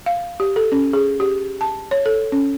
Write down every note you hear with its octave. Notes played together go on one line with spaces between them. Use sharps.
F5
G4
A4
C#4
G#4
G4
A5
C#5
A4
C#4